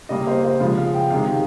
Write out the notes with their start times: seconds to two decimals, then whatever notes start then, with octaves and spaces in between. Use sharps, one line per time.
0.09 C#3 G3 A#3 D#5
0.27 C5
0.44 C5
0.60 C#3 F3 G#3 F5
0.78 F5
0.95 G5
1.11 C3 D#3 G#3 F5